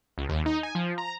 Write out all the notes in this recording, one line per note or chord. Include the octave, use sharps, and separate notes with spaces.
C#2
D#2
D#4
G#5
F3
A#5